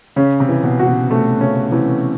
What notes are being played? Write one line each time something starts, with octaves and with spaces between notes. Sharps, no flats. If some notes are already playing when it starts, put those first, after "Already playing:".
C#3 C#4
C3
E3
B2
F#4
B2
C3 A3
C#3 C#4
C3 E3